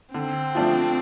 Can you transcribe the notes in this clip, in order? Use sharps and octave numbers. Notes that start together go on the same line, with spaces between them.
D3 C4
F3 A3 D4 F4